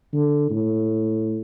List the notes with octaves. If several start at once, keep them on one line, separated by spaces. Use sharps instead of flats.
D3
A2